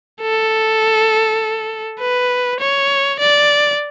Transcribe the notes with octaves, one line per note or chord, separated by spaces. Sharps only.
A4
B4
C#5
D5